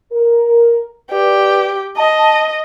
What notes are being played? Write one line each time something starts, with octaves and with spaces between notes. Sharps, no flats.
A#4
G4 B4 D5
D#5 A5